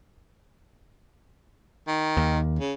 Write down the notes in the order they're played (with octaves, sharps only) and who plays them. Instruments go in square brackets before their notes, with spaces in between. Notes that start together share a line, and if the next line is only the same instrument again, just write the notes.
[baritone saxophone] D#3
[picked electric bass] D#2
[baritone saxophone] C#3